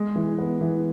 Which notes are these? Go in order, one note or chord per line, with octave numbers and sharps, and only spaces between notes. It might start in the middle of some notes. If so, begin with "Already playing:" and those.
Already playing: G#3
E3
B3
E3